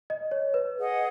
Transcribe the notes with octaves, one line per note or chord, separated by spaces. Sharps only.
D#5
C#5
B4
G#4 D#5 F#5